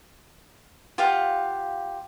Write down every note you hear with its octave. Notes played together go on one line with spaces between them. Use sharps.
F4 G4 F5 F#5